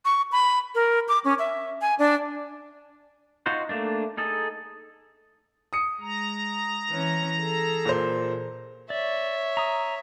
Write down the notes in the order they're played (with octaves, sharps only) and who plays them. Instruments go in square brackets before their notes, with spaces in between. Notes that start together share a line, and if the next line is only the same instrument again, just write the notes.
[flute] C#6
B5
A#4
D6
C#4
E5
G#5
D4
[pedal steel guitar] D#4 F4 F#4 C5
A3 A#3 D4
D#4 G#4 A4
[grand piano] D#6 C#7
[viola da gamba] G#3 [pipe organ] A#5
[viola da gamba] E3 C#4
G#4 A4
[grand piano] A#2 C5
[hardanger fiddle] C#5 E5 [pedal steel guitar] D5
[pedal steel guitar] A#5 D#6